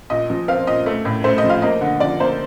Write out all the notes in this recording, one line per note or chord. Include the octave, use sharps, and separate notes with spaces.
A#2 D#5
F3
C4 F5
A#2 D#5
A3
A2
A3 C5
D#5
F3
F5
A#3 D#5
D3
F3 D5
A#3 C5